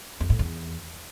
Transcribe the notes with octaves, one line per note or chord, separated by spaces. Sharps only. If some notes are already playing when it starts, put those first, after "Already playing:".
F2
A2
E2